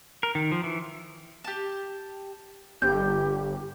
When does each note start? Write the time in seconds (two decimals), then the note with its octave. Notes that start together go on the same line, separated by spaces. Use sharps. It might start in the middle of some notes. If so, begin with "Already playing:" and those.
0.23 A#4
0.35 D#3
0.52 F3
0.64 E3
1.44 G4 A5
2.82 G1 G4 G6